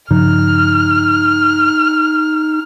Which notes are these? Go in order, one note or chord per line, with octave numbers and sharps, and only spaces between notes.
G2 C#3 F3 D#4 F6